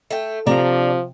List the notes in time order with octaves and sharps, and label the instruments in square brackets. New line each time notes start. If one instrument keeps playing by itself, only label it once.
[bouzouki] A3 G5
[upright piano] C3 [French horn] F3 [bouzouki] D4 D5 A#5